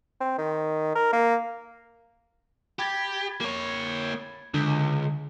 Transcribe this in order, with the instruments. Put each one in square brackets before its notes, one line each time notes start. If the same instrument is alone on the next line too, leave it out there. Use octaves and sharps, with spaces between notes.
[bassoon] C4
D#3
A#4
A#3
[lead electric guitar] G4 [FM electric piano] B5 G#6 A6
[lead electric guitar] A#3 C#5
[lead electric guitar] C#2 [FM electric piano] D3